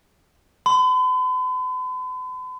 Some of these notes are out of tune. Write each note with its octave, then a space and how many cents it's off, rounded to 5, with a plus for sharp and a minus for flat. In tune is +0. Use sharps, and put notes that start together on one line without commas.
B5 +45